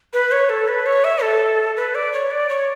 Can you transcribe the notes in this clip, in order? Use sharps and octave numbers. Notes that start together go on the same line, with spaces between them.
B4
C#5
A4
B4
C#5
E5
A4
B4
D5
C#5
D5
C#5